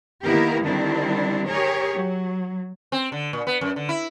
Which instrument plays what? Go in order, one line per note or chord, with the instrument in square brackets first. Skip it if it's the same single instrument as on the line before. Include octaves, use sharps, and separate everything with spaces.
[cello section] D#3 A#3 B3 E4 G4 A#4
D3 D#3 G3 C4 D4 E4
G4 G#4 A#4 C#5
F#3
[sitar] C4
D3
A#2
B3
F#2
D3
E4